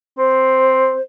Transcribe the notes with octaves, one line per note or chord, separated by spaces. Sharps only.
C4 C5